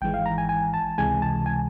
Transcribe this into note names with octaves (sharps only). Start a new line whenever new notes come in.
G#1 G#2 E3 G#3 G5
F5
A#5
G#5
G#5
A5
C#2 C3 E3 G#3 G#5
A5
G#5